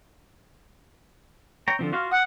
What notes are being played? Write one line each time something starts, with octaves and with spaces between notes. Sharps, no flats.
C#5 G5 A#5
D3 F3 C4
F4 F#4 F5
F#5 D#6